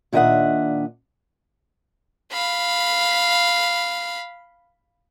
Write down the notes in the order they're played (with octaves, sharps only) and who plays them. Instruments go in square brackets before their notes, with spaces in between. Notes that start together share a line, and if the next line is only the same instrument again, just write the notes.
[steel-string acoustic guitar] A#2 D#3 D4 D#5 E5 F#5
[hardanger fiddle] F5 B5